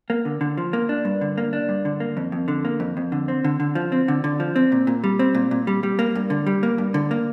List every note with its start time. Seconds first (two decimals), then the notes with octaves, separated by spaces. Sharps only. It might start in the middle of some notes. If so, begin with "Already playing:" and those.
0.10 A#3
0.25 D3
0.41 D3
0.57 F3
0.73 A#3
0.89 D4
1.05 G2
1.21 D3
1.38 A#3
1.53 D4
1.69 G2
1.85 D3
2.00 A#3
2.17 F2
2.32 F2
2.48 D3
2.65 A#3
2.80 F2
2.97 F2
3.12 D3
3.28 C4
3.44 D3
3.60 D3
3.75 F3
3.92 C4
4.08 D3
4.24 D3
4.40 F3
4.56 C4
4.72 A#2
4.87 A#2
5.04 G3
5.19 C4
5.35 A#2
5.51 A#2
5.67 G3
5.83 G3
5.99 A#3
6.15 G2
6.30 D3
6.46 G3
6.63 A#3
6.78 G2
6.94 D3
7.11 A#3